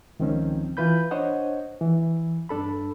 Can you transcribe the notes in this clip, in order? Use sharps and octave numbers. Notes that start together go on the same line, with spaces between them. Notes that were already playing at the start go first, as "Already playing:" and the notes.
C#2 D#3 F3 C4 C#4
E3 F4 B4 B5 G6
D4 C5 C#5 D#5 F#5
E3
G2 D4 A4 B5